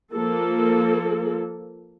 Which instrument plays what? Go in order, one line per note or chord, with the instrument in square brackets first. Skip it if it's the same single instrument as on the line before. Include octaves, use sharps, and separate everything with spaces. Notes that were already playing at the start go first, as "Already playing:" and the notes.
[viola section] F3 A#3 A4